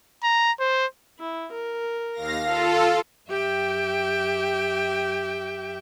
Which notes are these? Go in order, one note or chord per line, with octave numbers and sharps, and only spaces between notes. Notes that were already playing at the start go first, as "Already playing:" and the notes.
A#5
C5
E4
A#4
D#2 F5 A#6
F4 A4 F5
F#2 G4 E5 G5